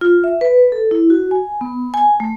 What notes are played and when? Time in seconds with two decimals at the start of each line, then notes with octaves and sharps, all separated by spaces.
0.01 F4
0.24 E5
0.41 B4
0.72 A4
0.91 E4
1.10 F#4
1.31 G#5
1.61 B3
1.94 G#5
2.20 A3